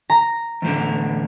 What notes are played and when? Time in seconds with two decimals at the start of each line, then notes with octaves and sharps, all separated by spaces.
0.10 A#5
0.62 E2 A2 D3